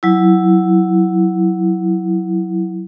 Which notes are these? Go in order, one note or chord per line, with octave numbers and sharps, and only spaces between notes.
F#3 E4